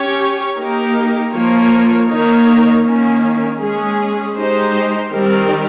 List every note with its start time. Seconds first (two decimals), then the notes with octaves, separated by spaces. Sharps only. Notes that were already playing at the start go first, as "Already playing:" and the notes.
Already playing: C#4 G4 C#5
0.58 A#3 D#4 G4 A#4
1.34 F3 A#3 F4 A#4 C#5
2.09 D#3 A#3 D#4 A#4 C#5
2.85 D#3 A#3 C#4
3.60 G#3 C#4 G#4
4.36 G#3 D#4 G4 C5
5.12 D#3 G3 C4 G4 A#4